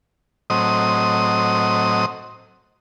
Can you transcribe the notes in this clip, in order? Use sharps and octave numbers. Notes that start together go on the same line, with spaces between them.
A2 F#3 C4 D#5 D#6